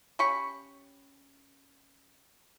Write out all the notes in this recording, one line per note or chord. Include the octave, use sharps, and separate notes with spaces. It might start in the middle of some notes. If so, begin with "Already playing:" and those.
C#4 G4 B5 C#6